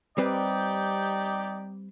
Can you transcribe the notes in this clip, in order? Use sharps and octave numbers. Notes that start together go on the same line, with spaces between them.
G3 C4 D#4 G4 B4 D5